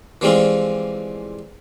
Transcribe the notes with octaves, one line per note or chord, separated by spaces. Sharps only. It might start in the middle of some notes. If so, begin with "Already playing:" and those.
E3 F3 G3 G#3 C4 F4